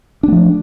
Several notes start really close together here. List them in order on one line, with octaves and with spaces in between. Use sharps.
D4 A3 F3